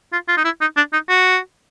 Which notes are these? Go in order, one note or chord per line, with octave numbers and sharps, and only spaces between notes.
F4
F4
D#4
E4
D#4
D4
D#4
F#4